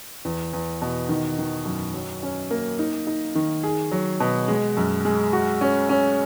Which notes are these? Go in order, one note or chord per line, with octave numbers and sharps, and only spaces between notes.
E2
E2
B2
D#3
D#3
F#2
F#3
C#4
A#3
D#4
D#4
D#3
G#4
F#3
B2
G#3
F#2
G#3
F#4
C#4
C#4